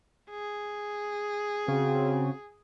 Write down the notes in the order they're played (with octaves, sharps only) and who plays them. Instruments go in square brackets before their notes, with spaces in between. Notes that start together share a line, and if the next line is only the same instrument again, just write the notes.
[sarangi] G#4
[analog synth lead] C#3 [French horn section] C4 F#4